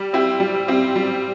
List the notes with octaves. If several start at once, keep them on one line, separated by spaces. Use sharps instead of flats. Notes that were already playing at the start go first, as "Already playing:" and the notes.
Already playing: G3
C4 E4 G4
G3
C4 E4 G4
G3